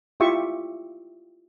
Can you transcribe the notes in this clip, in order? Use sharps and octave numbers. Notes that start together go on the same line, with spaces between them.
E4 F4 G4 E5 C#6